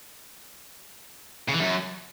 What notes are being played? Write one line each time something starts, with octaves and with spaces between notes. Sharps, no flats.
C#3
E3
F#2